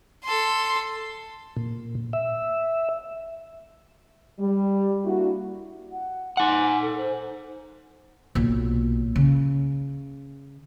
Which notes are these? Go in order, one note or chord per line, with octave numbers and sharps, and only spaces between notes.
A4 C6
A#2
E5
G3
A#3 D4 E4 F#4
F#5
D#4 F#5 G#5
A4
C5
B1 A#2
C#3